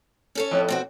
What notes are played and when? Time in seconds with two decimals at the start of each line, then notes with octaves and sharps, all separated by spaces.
0.35 C#4 A4 C#5
0.51 F2 A2
0.69 B2 C4 F#4